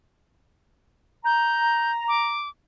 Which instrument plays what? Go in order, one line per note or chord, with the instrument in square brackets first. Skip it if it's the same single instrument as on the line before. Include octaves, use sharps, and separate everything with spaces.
[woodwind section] A#5 [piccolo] G6
[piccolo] D6